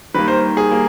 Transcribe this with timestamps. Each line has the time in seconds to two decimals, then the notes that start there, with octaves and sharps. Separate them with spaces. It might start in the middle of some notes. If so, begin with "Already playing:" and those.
0.14 D#3 G3 A#3 B4
0.28 C5
0.57 G#4
0.71 G3 A#3